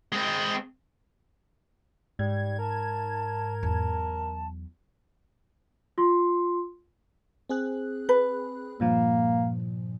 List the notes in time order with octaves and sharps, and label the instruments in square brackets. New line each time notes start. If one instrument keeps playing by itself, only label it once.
[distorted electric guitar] G#3 C4
[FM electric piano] G#2 G#6 [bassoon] G3
[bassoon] A#4 [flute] A5
[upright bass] E2 F#3 [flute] A5
[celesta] F4 C6
[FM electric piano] C4 G#4 F#6
[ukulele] B4
[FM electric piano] G2 A#2 F3 [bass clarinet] A#3